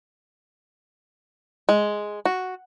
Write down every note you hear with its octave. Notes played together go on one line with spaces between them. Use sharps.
G#3
F#4